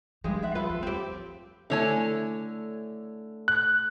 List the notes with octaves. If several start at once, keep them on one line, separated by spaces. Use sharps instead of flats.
G2 F3 G3 G#3
D5 E5 F#5
F4 A4 B4
F2
F2 C4 G4
D3 A3 E4 C#5 E5 G#5
F#6